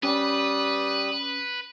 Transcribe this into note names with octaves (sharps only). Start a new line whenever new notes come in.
G3 C#4 B4 D#6